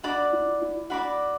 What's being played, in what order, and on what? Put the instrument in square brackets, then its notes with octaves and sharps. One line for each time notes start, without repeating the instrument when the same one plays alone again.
[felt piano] D4 [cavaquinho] F#4 D5 B5 D6
[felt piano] E4
E4
[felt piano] D4 [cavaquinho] F#4 D5 B5 D6